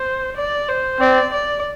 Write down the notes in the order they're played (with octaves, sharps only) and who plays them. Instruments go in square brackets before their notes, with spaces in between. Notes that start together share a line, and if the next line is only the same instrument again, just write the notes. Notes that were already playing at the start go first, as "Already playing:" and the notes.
Already playing: [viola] C5
D5
C5
[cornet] C4 [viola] D5
[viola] D5